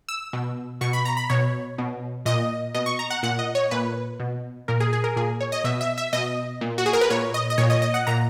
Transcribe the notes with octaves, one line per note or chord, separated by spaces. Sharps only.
E6
B2
B2 C#6
B5
A#5
B5
B2 C#5
B2
A#2 D#5
B2 D#5
C#6
A#5
F#5
A#2 F#5
D#5
C#5
A#2 B4
B2
A#2 A#4
G#4
G#4
A#4
A#2 G#4
C#5
D#5
B2 E5
E5
E5
B2 D#5
A#2
F#4
G#4
A#4
B4
A#2 C#5
D#5
D#5
A#2 C#5
D#5
D#5
F#5
A#2 A#5